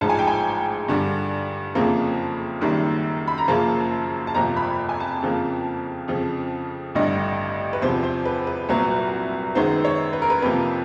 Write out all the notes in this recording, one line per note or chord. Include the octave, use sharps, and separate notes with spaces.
A1 G#2 F3 A5
G#5
G5
G#5
G2 D3 G3
F#1 F2 C#3 F3 A#3
F#1 F#2 D#3 G3
B5
A#5
F#1 F#2 C#3 F3 A#3 A5
A5
G1 F2 C3 F3 A#3 A#5
B5
G#5
A5
F2 C#3 F3 A#3
F2 C#3 F3
A1 G2 D3 G3 D#5
B4
E2 C3 F3 C5
C5
B4
B4
C2 A#2 F#3 B3
F#2 D#3 G#3 B3 C5
C#5
B4
A#4
B4
F2 C3 F3 A#3 B4